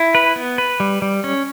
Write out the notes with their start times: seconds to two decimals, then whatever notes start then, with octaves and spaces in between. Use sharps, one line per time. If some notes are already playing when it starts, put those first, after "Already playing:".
Already playing: E4
0.15 B4
0.36 B3
0.58 B4
0.80 G3
1.02 G3
1.24 C#4